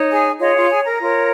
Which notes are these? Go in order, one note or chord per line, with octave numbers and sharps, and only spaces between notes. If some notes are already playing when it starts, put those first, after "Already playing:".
Already playing: D#4 C#5
G#4 G#5
F4 G#4 C#5 D#5
F4 F5
G#4 G#5
A#4 A#5
F4 A#4 C#5